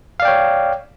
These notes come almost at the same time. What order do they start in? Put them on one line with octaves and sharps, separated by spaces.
F5 D5 G5 C#5